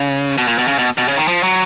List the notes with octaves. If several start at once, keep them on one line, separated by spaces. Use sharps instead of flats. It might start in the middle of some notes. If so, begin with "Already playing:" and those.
Already playing: C#3
B2
A#2
B2
C#3
B2
B2
C#3
D#3
F3
F#3